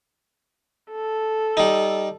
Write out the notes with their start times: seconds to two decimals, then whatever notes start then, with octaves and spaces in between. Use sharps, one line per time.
0.91 A4
1.57 G3 D#4